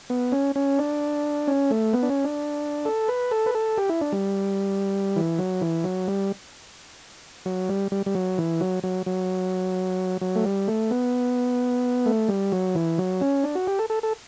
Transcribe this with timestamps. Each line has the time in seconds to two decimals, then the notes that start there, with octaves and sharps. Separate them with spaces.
0.10 B3
0.32 C#4
0.56 C#4
0.79 D4
1.47 C#4
1.71 A3
1.93 B3
2.03 D4
2.09 C#4
2.24 D4
2.85 A4
3.08 B4
3.31 A4
3.46 B4
3.55 A4
3.78 G4
3.89 E4
4.01 D4
4.12 G3
5.16 E3
5.39 F#3
5.62 E3
5.84 F#3
6.08 G3
7.46 F#3
7.69 G3
7.92 G3
8.06 G3
8.15 F#3
8.38 E3
8.61 F#3
8.83 F#3
9.06 F#3
10.21 F#3
10.35 A3
10.45 G3
10.68 A3
10.91 B3
12.06 A3
12.29 G3
12.52 F#3
12.75 E3
12.98 F#3
13.21 C#4
13.44 D4
13.55 F#4
13.67 G4
13.79 A4
13.90 A4
14.03 A4